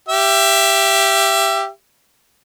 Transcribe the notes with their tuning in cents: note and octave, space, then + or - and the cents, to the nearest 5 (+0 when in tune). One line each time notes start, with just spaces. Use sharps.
G4 +0 E5 +25